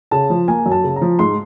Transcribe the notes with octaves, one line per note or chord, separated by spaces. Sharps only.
C#3 A5
F3
A#3 G#5
F#2
A5
C#3
A#5
F3
G#2 C6